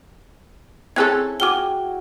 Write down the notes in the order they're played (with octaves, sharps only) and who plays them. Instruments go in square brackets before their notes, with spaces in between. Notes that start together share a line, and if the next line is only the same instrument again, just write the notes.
[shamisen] C4 C#4 A4 [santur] E4 [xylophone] G#4 F#6 G#6
[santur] F#4 G#4 G5 [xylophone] D6 F6 G7